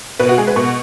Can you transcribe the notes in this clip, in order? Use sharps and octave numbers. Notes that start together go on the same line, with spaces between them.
B2 B4
F#4
G#3 G#4
B4
B2 C#6